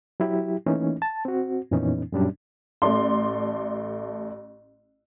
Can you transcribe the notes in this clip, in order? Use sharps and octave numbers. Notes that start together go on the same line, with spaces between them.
F#3 E4 G4
E3 A3 A#3 C#4 D#4
A5
C4 F#4
F2 A#2 E3 B3 C#4 D#4
F#2 A#2 F#3 G3 C#4 D4
A1 A3 D5 C6